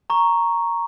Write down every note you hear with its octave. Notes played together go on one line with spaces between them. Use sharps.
A#5 C#6